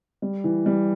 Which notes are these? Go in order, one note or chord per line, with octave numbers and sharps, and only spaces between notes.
G3
E3
G3